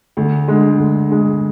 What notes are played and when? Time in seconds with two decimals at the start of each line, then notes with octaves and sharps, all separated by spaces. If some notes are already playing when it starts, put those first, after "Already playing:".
0.17 D2
0.48 D3 G#3
0.78 D2
1.09 D3 G#3